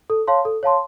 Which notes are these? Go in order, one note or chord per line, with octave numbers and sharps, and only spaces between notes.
A4
C#5 F5 A5 C6
A4
C#5 F5 A5 C6